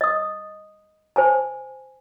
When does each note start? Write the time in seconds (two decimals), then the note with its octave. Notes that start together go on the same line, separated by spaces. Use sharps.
0.01 D#5 D#6
1.16 C5 G#5 A5